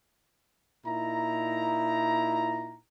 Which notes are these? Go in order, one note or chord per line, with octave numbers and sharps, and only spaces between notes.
A#2 D#4 E4 A#5